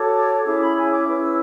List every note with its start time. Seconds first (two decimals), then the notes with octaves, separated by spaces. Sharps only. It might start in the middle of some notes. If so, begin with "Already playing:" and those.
Already playing: F#4 A4 C#5 D6
0.45 C#4 E4 G#4 C#5 D6
0.59 B5
0.75 G#5
0.90 D6
1.05 C#4 E4 B4
1.20 E6